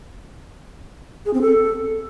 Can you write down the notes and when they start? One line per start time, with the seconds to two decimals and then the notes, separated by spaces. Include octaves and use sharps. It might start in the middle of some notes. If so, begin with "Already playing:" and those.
1.26 G#4
1.34 C4
1.41 A4